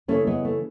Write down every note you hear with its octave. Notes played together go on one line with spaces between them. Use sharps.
C#3 E3 A3 C#4
G#3 B3
A3